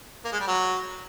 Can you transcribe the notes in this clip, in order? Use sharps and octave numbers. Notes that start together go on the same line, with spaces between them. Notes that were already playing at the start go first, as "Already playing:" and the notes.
A#3
G#3
G3
F#3